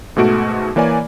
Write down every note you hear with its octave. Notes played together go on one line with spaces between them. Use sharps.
G#2 B2 A3 F#4 D7
E3 A#3 C#5 D5 G#5